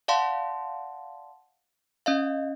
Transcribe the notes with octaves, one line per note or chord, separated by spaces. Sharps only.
D5 F5 F#5 A5 C6
C#4 D#5 F5